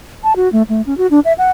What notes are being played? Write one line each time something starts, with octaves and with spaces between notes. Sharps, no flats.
A5
F#4
A3
A3
C#4
F#4
D4
E5
F#5